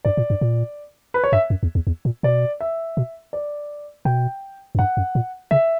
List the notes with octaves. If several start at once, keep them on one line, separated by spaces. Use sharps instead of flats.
G2 D5
A#2
G2
A#2
B4
C#5
G2 E5
F#2
E2
E2
E2
A#2
B2 D5
E5
B2
D5
B2 G5
F#2
G2 F#5
F#2
A#2
C#3 E5